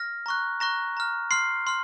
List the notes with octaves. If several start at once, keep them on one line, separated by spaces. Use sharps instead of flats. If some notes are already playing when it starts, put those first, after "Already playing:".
Already playing: F6 A#6
A#5 C#6 F#6
A#5 C#6 F#6 A#6
A#5 F6
C6 F6 C7
C6 F6